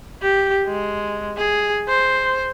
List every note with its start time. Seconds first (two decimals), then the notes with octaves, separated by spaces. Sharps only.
0.22 G4
0.66 G#3
1.37 G#4
1.88 C5